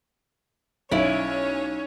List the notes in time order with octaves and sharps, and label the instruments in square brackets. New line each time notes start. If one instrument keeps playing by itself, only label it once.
[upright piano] B1 [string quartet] C#4 C#5 [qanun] E4 D5